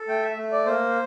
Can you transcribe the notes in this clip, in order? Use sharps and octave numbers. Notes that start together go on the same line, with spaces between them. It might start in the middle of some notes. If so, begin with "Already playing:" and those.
Already playing: A4
A3 G5
E5
A3
D5
A#3 C5